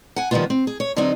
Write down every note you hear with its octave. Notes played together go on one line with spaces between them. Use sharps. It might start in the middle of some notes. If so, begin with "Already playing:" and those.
F#5 G#5
D#3 F3 G3 A3 B3 F4
C4
G#4
C#5
D3 F#3 B3 C4 D#4